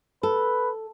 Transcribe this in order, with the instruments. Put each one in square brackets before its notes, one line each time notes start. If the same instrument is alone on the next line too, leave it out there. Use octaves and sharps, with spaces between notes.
[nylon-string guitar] A4 [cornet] B4